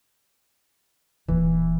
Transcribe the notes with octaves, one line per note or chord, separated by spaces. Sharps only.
D#1 E3